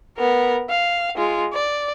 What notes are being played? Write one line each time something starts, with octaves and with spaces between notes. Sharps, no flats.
B3 A#4
F5
G#3 F4
D5